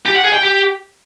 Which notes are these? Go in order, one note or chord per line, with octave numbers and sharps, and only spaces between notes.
G4
F#5
G#4
G5
G4